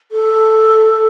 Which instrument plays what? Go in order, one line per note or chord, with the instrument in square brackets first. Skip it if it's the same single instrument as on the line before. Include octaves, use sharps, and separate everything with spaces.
[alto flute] A4